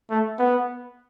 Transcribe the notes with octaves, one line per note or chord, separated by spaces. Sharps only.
A3
B3